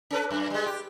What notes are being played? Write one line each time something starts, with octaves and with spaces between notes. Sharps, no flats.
C#4 A4 B4
F#2
G3 G#3
G4